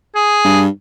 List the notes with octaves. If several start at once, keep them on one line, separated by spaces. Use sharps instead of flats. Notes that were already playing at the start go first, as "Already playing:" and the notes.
G#4
G2